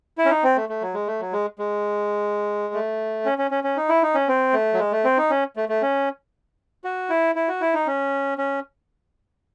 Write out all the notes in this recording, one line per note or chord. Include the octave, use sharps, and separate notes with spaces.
E4
C#4
D#4
C4
A3
A3
F#3
G#3
A3
F#3
G#3
G#3
A3
C#4
C#4
C#4
C#4
D#4
E4
D#4
C#4
C4
A3
F#3
G#3
A3
C4
D#4
C#4
A3
A3
C#4
F#4
E4
E4
F#4
E4
D#4
C#4
C#4